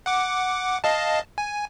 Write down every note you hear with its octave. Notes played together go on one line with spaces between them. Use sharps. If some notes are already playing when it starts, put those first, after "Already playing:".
F#5 D6
D#5 F5 A5
G#5